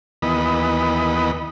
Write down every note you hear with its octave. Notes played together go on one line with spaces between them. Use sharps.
D#2 E3 B3 D#5 B5